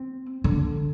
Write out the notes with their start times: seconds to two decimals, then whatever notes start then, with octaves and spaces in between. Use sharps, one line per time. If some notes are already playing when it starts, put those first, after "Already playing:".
Already playing: C4
0.44 D3